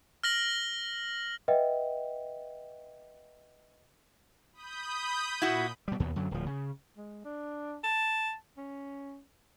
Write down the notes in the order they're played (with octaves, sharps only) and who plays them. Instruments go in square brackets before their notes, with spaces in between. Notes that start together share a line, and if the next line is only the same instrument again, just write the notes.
[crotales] F6 A#6 F#7
[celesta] B4 D#5 E5 F#5 G5
[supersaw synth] B5 D#6 G6
[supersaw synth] A#2 [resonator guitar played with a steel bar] E4 F#4
[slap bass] B2 G3
D#2 B2
F#2 D3 F#3
D1 F3
C#3
[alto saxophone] G#3
D4
A5
C#4